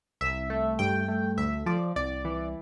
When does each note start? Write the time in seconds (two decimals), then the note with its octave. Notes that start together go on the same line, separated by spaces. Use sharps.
0.21 C2 E5
0.50 A3
0.79 G2 G5
1.08 A3
1.37 D2 E5
1.66 F3 D5
1.96 C2 D5
2.25 E3